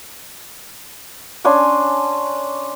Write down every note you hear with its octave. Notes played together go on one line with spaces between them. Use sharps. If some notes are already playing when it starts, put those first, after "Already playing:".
C#4 D4 G#5 C6